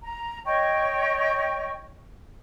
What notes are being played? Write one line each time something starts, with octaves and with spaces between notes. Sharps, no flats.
A#5
C#5 D#5 G5 C#6